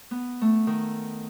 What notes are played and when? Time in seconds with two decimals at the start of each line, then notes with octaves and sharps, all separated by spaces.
0.11 B3
0.41 A3
0.67 D#3